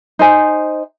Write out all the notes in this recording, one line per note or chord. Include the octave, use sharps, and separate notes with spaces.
D#4 C5 G#5